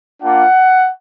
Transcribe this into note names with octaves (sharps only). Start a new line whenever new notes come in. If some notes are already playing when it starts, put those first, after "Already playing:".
A#3 D4 F4 F#5